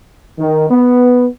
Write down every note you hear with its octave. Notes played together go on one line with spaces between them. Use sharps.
D#3
B3